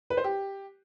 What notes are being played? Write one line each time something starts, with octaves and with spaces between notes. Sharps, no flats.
B4
C5
G4